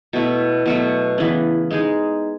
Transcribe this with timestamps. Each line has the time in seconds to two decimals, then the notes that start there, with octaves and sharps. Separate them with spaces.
0.13 B2 A3 E4
0.66 B2 F#3 A3
1.18 C#3 E3 B3
1.71 G#3 D#4 G#4